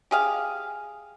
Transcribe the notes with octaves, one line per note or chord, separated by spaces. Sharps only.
G4 G#4 F5